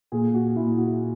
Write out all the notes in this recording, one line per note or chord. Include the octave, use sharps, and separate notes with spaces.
A#2 G#4
F#4
A#2 E4
F#4